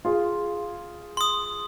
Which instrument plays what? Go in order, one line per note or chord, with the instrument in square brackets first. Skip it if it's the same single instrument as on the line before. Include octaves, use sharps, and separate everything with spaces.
[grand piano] F4 G#4
[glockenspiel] C6 D#6